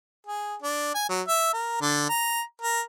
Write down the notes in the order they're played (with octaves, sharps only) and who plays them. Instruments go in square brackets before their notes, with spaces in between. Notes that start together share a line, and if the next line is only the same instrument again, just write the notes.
[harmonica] G#4
D4
G#5
F#3
E5
A#4
D3
A#5
A#4